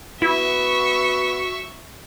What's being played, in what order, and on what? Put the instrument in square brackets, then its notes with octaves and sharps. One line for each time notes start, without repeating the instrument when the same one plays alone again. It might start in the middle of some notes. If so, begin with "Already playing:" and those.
[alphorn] B3 [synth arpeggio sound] E4 [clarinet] F#4 [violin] E5 C#6